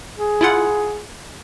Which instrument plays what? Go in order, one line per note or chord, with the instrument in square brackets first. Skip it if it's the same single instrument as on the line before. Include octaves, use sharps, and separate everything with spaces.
[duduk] G#4
[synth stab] E4 F4 F#5